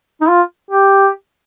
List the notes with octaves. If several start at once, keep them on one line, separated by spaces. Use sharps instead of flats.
D#4
F4
G4